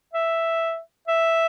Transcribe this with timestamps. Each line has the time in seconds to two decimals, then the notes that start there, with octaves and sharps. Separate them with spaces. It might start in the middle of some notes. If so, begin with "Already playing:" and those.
0.14 E5
1.08 E5